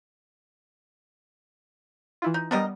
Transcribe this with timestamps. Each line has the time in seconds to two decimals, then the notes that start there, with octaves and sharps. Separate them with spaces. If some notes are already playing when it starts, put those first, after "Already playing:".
2.22 E3 E4 F4
2.34 D#4
2.51 G3 B3 D4 A#4 D#5